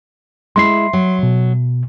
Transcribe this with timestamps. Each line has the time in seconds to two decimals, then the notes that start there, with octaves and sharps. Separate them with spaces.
0.56 G#3 E4 C6 C7
0.93 F#3
1.23 B2